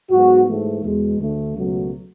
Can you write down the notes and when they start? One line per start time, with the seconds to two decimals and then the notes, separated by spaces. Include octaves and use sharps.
0.10 G#2 F#3 B3 F#4
0.47 G#2 E3 A3
0.83 E2 B2 G#3
1.19 D2 D3 A3
1.56 C#2 B2 F#3 A3